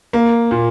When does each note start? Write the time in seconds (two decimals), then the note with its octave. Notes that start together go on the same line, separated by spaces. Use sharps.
0.13 A#3
0.51 A#2